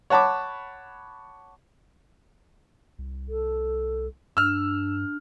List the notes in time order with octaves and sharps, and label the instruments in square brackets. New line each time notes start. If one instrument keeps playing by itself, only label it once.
[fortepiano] C#5 F#5 A5 B5 D6
[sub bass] C2
[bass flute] A4
[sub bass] G2 [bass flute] D4 [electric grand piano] E6 F6